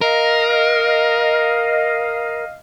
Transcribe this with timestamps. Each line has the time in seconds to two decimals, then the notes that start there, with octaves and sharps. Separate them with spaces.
0.01 A#4 D#5 F5